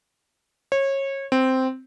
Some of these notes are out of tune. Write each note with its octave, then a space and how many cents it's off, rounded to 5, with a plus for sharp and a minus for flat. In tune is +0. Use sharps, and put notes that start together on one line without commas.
C#5 -25
C4 -5